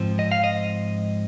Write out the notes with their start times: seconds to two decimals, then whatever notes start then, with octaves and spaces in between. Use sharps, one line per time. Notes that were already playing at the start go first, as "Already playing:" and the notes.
Already playing: G#2 F3 C4
0.19 D#5
0.32 F5
0.44 D#5